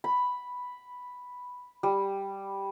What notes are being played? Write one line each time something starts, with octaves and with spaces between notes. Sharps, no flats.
B5
G3